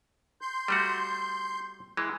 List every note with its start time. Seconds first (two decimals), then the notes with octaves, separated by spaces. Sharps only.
0.41 C6 G6
0.68 G3 A3 F#4
1.97 E3 G#3